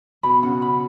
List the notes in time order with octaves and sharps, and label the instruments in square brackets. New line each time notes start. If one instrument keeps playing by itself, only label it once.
[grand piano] B2 [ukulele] B5
[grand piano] C#3 [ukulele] F#5
[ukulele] B5